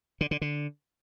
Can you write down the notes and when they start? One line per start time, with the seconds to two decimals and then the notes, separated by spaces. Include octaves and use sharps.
0.21 D3
0.31 D3
0.41 D3